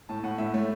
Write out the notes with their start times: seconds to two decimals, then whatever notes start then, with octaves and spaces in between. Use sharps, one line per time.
0.09 A2 A5
0.23 A2 F#5
0.38 A2 E5
0.54 A3 C#5